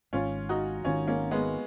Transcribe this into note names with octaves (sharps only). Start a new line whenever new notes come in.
G#1 G#2 D#3 C#4 F4
D#4 F#4
G#1 G#2 D#3 C#4 F4
A#3 C#4
G#3 B3